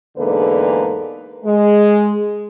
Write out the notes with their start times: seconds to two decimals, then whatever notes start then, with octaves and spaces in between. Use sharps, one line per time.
0.17 E2 G#2 D3 A#3 A4 B4
1.44 G#3